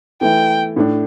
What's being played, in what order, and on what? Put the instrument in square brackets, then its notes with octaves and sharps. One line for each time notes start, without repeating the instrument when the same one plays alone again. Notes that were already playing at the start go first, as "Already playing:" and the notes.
[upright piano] E3 A3 E4 [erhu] G5
[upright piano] A2 A3 D4